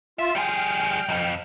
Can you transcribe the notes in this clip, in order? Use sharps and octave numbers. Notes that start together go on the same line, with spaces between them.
F4 E5
G3 G#4 G5 F6
B1 F2